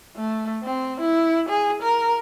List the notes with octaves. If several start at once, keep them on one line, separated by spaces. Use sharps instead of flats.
A3
C4
E4
G#4
A#4